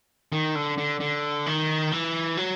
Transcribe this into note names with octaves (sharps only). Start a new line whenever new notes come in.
D#3
D3
D3
D3
D#3
E3
F#3